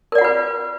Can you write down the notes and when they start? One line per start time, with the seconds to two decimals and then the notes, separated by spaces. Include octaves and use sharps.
0.12 A#4
0.15 D5
0.18 F#5
0.21 F4
0.24 B4